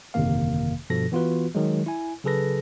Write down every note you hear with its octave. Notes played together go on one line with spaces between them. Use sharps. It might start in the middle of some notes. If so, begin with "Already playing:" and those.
G1 F2 C3 D#3 A#3 F5
G2 B2 F3 A4 A#6
E3 B3 F4 F#4 B4
D#3 F#3 G#3
E4 G#5
C#3 F#3 G#4 A4 B4 A#6